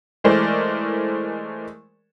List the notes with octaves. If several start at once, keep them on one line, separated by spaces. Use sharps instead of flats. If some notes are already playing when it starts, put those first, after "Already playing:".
E3 G#3 A3 A#4 C5 D5